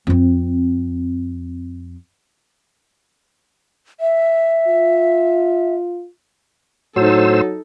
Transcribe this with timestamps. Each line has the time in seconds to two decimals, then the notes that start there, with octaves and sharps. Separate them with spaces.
0.07 F2 C4
4.00 E5
4.67 F4
6.96 A2 F#3 D#4 A4 C5 E6